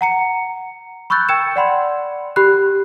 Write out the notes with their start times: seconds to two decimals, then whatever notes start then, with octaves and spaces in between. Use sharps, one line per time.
0.01 F#5 A#5 C#7
1.10 B5 C#6 E6 F#6 G6 A6
1.29 G5 E6 G#6 C#7 E7
1.56 D5 F#5 B5 C6
2.36 G4 B5 F#6